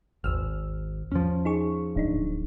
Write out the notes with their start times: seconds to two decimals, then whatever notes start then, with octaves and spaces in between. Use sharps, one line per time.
0.24 G#1 D#2 E6 F6
1.12 E2 F3 C#4
1.45 D#4 G#4 C#6
1.96 D1 G#2 D4 D#4